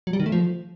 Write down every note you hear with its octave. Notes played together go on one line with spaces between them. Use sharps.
F#3
G3
D#3
A3
F3